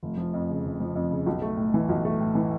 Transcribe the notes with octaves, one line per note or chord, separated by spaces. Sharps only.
F1
F3
F2
C#3
F1
F3
F2
C#3
B1
A3
A2
E3
B1
A3
A2
E3